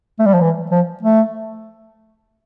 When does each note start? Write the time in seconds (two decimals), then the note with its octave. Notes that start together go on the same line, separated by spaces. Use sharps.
0.19 A3
0.26 G3
0.34 F3
0.41 E3
0.71 F3
1.03 A3